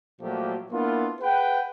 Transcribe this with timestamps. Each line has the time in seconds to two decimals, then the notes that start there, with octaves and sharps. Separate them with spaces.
0.21 A#2 F3 F#3 A3 A#3 G4
0.71 A#3 B3 D4 E4 F4
1.21 G#4 B4 F#5 G5